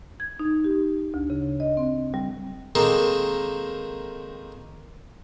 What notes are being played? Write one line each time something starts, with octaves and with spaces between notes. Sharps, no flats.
G#6
D#4
G4
D2
C#3
D#5
C4
G3
D#3 G#3 A#3 C4 G#4 A4